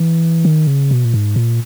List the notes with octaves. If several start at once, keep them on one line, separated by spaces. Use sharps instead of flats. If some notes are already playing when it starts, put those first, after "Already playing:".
Already playing: E3
D#3
C#3
B2
A#2
G#2
A#2